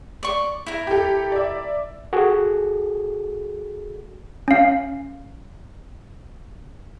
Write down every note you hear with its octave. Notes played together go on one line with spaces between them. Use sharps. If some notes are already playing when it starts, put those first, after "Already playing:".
D5 C#6
E4 A#4
G4 A4
D5 E5
F#4 G#4 A4
C#4 F5